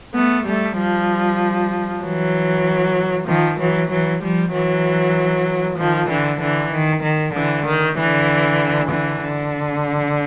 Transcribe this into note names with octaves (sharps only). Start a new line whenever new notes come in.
A3 B3
G3 A3
F3 G3
E3 F#3
D#3 F3
E3 F#3
E3 F#3
F3 G3
E3 F#3
D#3 F3
D3 E3
D3 E3
D#3
D#3
D3 E3
D#3
D3 E3
D3 E3
D3